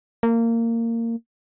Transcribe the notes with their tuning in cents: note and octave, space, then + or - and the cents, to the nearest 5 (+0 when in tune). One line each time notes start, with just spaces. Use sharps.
A#3 -20